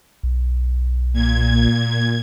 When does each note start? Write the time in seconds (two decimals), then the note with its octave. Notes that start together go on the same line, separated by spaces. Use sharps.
0.23 B1
1.13 A#2 G#6